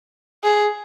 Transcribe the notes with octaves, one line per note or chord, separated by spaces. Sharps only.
G#4